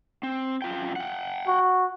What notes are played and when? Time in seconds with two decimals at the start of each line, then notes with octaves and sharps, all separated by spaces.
0.23 C4
0.62 F#2 F4 G5
0.96 F#5 G5
1.48 F#4